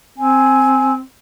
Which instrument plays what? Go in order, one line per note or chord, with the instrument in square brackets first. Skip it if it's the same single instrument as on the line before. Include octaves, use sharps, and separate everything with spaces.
[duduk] C4 [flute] G#5